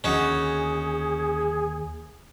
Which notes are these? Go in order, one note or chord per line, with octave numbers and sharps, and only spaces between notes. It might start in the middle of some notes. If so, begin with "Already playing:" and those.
D#2 D3 C#4 D#4 F#4 G#4